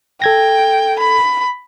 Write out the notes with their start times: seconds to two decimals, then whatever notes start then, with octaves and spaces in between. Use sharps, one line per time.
0.22 A4 G5 G#6 A#6
0.99 B5